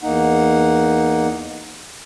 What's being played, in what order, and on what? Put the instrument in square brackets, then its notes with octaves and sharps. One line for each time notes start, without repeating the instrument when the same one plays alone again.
[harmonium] E2 A#3 D#4 F#5